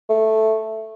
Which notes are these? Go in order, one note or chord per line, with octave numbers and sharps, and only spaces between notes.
A3